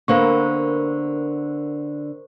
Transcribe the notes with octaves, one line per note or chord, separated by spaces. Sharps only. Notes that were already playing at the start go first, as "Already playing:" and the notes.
D3 A#3 B3 A#4 C5 C#6